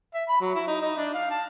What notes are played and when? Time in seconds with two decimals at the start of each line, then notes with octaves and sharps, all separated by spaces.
0.14 E5
0.28 B5
0.41 F#3
0.55 E4
0.67 D#4
0.81 D#4
0.97 D4
1.14 F5
1.30 A5